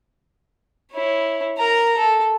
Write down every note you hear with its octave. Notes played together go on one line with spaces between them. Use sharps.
E4 C#5
A#4 A#5
A4